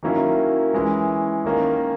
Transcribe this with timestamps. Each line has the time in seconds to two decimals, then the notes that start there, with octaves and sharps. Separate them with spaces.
0.03 D#3 F#3 A#3 C#4 E4
0.73 E3 G#3 C#4 E4
1.45 D#3 A#3 C#4